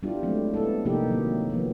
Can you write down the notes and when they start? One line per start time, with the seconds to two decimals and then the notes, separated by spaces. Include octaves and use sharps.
0.03 G3 B3 D4 E4 F4 G4
0.23 F#3 G#3 A3 C4
0.54 B3 E4 A4
0.85 C3 F3 A#3 D#4 G4 A4
1.07 C3 D#3 F#3 A#3
1.50 F3 A#3 B3